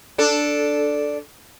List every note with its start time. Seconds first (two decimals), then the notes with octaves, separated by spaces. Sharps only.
0.18 D4 A4